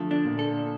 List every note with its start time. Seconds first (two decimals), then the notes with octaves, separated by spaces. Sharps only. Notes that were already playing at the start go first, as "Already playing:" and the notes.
Already playing: D3 F3 A3
0.11 D4
0.25 A#2 D3
0.39 A4